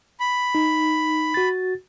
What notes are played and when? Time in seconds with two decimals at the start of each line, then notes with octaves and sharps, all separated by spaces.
0.20 B5
0.55 D#4
1.34 F#4 A6